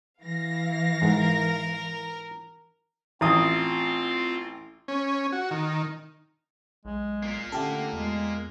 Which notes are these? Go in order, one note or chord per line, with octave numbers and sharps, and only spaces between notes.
E3 F5 A#6
G#2 A#4
A1 C4 F4 F5 D#6
C#4
F#4
D#3
B1 G#3
A#3 F4
D3 A3 C#4 G4 A4
E2 G#3